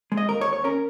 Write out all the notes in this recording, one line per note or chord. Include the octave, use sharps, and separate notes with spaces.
G#3
D#5
D#2 A#4
C#5
D#2
C#5
C#4 A#4